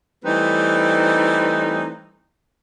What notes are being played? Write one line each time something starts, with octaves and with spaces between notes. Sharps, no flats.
E3 G3 A3 C4 D#4 B4